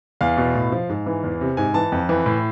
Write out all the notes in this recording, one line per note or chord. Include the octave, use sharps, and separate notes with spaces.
E2 F5
B2
A2
F3
G#2
E3
E2
C3
G#2 G#5
E3 A5
F2
E3
A2